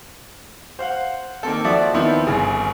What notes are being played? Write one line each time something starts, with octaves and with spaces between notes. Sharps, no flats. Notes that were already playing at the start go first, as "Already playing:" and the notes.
C5 F5 F#5
D#3 A#3 C4 A4
F3 F4 F#4 D5 E5
D#3 F3 B3 C4 E4
G1 C#3 G#5